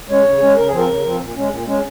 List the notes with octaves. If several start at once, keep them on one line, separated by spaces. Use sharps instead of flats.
G#3 C#4 C#5
C#3
G#3 C#4
C#3 A#4
F3 C4 G#4
A#4
C#3
F3 C4
A#2
G#3 C#4
A#2
G#3 C#4